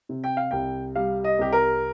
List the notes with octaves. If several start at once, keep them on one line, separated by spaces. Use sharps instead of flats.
C3
G5
F5
C2 G5
G3 F5
D#5
C2 G4
A#4